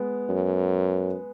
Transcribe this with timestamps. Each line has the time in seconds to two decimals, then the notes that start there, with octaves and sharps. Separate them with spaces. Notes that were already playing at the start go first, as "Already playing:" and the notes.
Already playing: G#3 B3
0.29 F#2